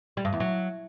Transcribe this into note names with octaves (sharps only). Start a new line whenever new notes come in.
G3
G2
E2
F#3